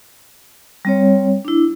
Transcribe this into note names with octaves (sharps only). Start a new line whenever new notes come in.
G3 C4 C#5
D4 E4